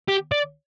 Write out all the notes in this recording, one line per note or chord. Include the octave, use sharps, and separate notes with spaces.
G4
D5